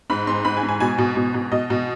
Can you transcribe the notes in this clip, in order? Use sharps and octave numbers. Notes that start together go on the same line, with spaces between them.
G#2 B5
G#2 C6
G#2 B5
G#5
G#2
G#5
B2 G#5
B2
B2
B2
B2 D#5
B2